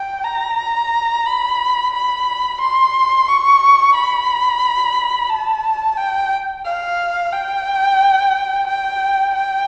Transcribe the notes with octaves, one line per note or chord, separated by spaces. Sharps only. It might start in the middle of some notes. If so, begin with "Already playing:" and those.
Already playing: G5
A#5
B5
B5
C6
C#6
B5
A5
G5
F5
G5
G5
G5